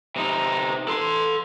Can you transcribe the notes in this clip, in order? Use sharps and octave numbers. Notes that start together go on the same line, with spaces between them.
C3 D#4
A4 C6